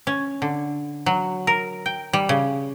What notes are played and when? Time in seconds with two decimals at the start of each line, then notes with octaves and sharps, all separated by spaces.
0.07 C#4
0.42 D3
1.06 F#3
1.47 A#4
1.86 G5
2.13 G3
2.29 C#3